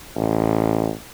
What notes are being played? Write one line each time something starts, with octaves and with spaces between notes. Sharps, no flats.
A1